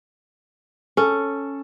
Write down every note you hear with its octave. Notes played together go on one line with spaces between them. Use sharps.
C#4 A4